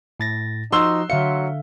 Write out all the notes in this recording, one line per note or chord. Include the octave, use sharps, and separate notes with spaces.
A2 A6 A#6
F3 D#4 F#4 C6 E6 G7
D3 F#3 E5 F5 C#7